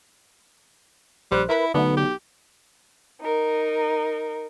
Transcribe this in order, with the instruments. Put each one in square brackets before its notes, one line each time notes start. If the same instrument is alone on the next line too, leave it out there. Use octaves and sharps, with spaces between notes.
[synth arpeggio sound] A#1 C5 F#6 [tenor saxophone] G3
[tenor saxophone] E4 [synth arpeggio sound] A#4 B4 B5
[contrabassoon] B1 [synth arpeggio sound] D3 A3 [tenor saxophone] B3
[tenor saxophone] G4
[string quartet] D#4 A#4